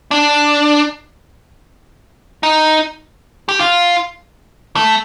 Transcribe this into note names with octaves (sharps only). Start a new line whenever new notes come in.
D4
D#4
G4
F4
A3